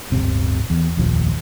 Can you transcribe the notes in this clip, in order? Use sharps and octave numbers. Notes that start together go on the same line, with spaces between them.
D1 G1 C3 C4
E2
F1 A#1 D#2 F3